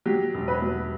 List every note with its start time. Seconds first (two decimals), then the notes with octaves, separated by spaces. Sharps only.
0.06 F#3 G4
0.34 E1
0.48 B4
0.62 F#3